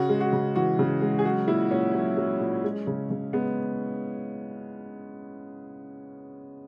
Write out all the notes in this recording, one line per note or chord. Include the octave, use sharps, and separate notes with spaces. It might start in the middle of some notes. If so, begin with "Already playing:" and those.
Already playing: C#3 F#4
G#3
F#4
C#3
E3 F#4
C#3
G#3
G#4
F#3 F#4
A#2 E4
A#2 C#4
F#3
F#3
A#2
G#3
C#3
C#3
G#3 B3